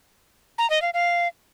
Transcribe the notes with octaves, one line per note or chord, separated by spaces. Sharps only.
A#5
D#5
F5
F5